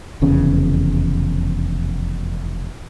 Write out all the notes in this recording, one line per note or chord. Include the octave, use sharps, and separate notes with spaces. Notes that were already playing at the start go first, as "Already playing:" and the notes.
F1 E2 C#3 C#4